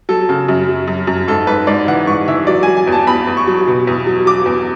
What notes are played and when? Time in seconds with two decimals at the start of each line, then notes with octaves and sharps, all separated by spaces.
0.09 F#3 A4
0.29 C#3
0.48 F#2
0.68 F#3
0.88 F#2
1.07 F#2
1.27 G#2 A4
1.47 G#2 B4
1.67 G#2 D5
1.87 E3 F#5
2.07 G#2 C#6
2.28 E3 E5
2.47 F#3 D5
2.63 F#3 G#5
2.77 G#5
2.87 E2
2.92 A5
3.07 E2 B5
3.27 E2
3.37 C#6
3.47 F#3
3.67 B2
3.87 E2
4.07 F#3
4.26 F#3 D6
4.46 E2